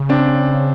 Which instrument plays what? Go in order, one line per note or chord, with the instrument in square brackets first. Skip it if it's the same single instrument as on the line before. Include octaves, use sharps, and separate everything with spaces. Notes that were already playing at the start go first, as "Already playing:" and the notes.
Already playing: [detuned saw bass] C#3
[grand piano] C4 D4